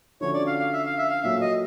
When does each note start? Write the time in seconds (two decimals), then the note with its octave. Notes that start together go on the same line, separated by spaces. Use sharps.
0.21 D3 F3 A3 C#4 F#4 C#5
0.34 D5
0.47 F5
0.60 F5
0.73 E5
0.85 F5
0.98 E5
1.11 F5
1.23 A#2 F#3 A3 E5
1.41 D#5